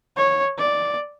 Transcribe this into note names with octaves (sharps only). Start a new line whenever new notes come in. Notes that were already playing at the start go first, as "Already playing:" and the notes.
C#5
D5